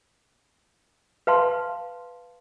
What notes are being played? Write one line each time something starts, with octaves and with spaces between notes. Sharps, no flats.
B4 F5 A5 C6